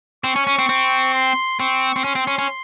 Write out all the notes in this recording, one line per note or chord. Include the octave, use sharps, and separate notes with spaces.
C4 C#6
C#4
C#4
C4
C4
C6
C4 C#6
C4
C#4 C6
C4
C#4
C#4